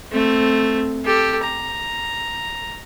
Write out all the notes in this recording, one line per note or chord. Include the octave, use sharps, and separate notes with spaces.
A3 C4
G4 A4
A#5